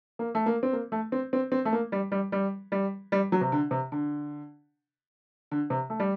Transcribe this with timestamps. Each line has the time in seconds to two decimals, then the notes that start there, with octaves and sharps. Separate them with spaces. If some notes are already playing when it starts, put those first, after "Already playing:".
0.19 A#3
0.35 A3
0.46 A#3
0.63 C4
0.73 A#3
0.92 A3
1.12 C4
1.33 C4
1.52 C4
1.65 A3
1.73 A#3
1.92 G3
2.12 G3
2.32 G3
2.72 G3
3.12 G3
3.32 F#3
3.41 C3
3.52 D3
3.71 C3
3.92 D3
5.51 D3
5.70 C3
5.90 A3
6.00 G3